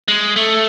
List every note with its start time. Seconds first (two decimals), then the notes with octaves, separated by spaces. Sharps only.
0.08 G#3
0.36 A3